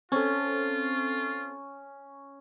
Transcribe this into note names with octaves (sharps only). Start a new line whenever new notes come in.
C4 C#4 F4 A4